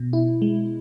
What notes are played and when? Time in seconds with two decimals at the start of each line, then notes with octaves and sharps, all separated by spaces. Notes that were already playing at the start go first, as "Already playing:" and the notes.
Already playing: B2
0.13 E4
0.42 G#3